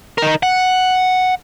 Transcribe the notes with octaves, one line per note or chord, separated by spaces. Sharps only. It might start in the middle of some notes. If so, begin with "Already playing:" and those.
D#4 A#4
F#5